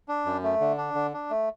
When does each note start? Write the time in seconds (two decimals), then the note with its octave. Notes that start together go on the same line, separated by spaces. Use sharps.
0.08 D4
0.25 F#2
0.43 A3
0.61 D3
0.78 D4
0.95 D3
1.13 D4
1.31 A3